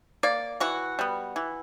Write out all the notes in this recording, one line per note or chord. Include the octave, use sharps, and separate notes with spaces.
A#3 D5
E3 F#4
G3 B3
E3